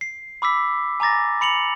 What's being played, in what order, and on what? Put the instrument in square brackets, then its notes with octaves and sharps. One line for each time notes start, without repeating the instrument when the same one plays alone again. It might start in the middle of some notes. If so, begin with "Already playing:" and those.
[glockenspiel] C7
B5 D6 E6 B6
G#5 A#5 D6 A6 A#6
B5 C#7 F7 F#7